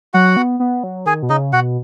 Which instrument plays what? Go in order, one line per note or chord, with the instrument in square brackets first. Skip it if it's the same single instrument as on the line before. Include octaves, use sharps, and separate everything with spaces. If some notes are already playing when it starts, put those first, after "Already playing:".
[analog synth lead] F#3 [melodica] F#4 F#5
[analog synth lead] B3
B3
F#3
[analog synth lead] D#3 [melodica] G#4 G#5
[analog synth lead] B2
[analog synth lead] C#3 [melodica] D#4 D#5
[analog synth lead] B2 [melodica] F#4 F#5